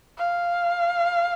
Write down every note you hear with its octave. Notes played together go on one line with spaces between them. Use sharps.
F5